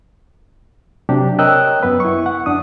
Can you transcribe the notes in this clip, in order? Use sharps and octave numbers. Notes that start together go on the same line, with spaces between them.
C3 F#3 D4 G4
A#4 C#5 D#5 G5 E6 F#6
F#2 B3 B4
E4 C#6
F#5
F#2 D4 D#6